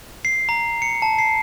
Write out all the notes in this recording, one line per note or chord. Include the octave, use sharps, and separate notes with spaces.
C7
A#5
C#7
A5
C7